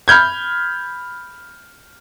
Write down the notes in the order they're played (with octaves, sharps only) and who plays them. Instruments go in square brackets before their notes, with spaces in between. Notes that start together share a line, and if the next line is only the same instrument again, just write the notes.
[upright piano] B5 F6 G6 G#6